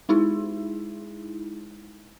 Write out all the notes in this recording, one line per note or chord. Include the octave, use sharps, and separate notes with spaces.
G#3 D#4 E4 G#4